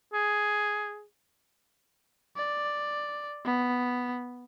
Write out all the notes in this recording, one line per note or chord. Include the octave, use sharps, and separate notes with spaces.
G#4
D5
B3